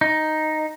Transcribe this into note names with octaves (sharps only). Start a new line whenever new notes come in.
D#4